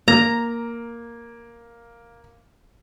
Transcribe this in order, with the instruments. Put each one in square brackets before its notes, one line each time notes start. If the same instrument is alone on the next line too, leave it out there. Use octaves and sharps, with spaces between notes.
[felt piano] A#3 [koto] A#5